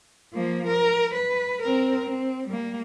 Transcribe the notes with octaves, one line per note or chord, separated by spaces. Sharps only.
F3 A#3
A#4
B4
C4 A#4
C4
G3 A#3